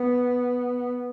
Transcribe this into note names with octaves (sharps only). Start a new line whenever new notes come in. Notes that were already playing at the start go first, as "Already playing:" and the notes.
Already playing: B3